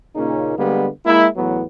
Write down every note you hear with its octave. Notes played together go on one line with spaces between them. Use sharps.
A#2 C#3 A#3 C#4 D#4
D3 G3 G#3 A#3 B3
G#3 A#3 E4
E2 A2 F#3 B3